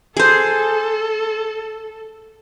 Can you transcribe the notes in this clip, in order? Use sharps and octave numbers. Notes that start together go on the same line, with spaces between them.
G#4 A4 C5